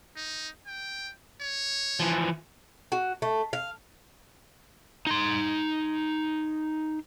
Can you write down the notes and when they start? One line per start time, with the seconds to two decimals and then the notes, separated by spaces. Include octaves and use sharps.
0.17 D#4
0.67 G5
1.42 C#5
2.00 E3 F3
2.92 F#4
3.22 A3
3.53 F5
5.07 D#4 C6